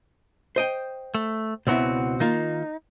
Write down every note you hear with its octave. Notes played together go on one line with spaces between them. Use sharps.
C5 D#5 G5
A3
C#2 B2 B3 C4 E4 F#4
D#3 A#3 D#4 F4